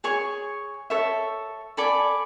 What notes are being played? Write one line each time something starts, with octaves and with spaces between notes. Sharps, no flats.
G#4 C#5 G#5 C#6
A4 C#5 E5
A4 D5 G#5 B5